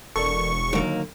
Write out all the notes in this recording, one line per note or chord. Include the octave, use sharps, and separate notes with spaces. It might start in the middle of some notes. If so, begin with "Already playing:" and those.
E1 A4 A#4 D5 C#6
D#2 D3 F#3 A#3